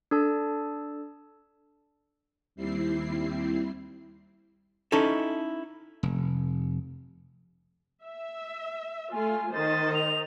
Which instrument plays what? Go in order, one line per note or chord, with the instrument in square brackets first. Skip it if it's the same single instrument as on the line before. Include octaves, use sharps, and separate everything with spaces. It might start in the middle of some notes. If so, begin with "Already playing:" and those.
[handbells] D4 A4 A5
[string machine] D#2 G3 C4 E4 C7
[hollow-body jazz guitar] C#4 D#4 E4 A4
[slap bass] F1
[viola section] E5
[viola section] A3 F4 [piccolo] G#5
[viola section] D#3 C5 D#5 [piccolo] A6
[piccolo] F7